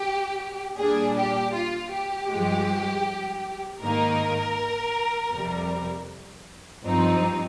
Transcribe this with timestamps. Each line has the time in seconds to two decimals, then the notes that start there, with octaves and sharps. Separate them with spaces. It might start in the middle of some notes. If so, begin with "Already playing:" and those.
Already playing: G4
0.78 A#2 G3 D4 G#4
1.17 G4
1.53 F4
1.92 G4
2.29 G2 F3 G#3
3.80 G#2 D#3 A#3 D#4 A#4
5.33 F2 C3 G3
6.84 G2 F3 C4 D#4